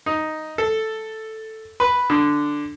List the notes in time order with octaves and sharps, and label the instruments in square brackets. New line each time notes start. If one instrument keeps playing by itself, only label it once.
[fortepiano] D#4
A4
B4
D3